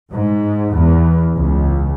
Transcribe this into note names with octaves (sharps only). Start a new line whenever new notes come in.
G#2
E2
C#2